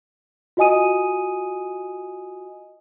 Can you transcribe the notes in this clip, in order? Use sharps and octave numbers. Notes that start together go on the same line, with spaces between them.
F4 F#4 D#5 G#5 D#6 D#7